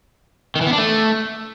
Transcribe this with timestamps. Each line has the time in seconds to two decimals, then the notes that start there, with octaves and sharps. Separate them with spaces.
0.56 D#3
0.61 E3
0.67 B3
0.72 D4
0.78 A3